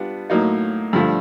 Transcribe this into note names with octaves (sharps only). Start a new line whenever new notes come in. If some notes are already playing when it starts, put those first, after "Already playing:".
Already playing: G3 B3 D4 F4
A2 F#3 A#3 D#4
G2 D3 F3 A3